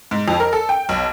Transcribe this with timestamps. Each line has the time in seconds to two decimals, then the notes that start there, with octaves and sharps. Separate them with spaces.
0.11 G#2
0.28 F2
0.40 A#4
0.53 A4
0.69 G5
0.89 B1